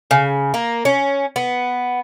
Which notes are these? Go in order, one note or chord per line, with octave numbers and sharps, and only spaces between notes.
C#3
A#3
C#4
B3